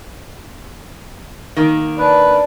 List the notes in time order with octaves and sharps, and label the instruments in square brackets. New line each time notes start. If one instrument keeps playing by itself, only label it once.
[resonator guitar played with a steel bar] D#3 A#3
[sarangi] D4 [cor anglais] B4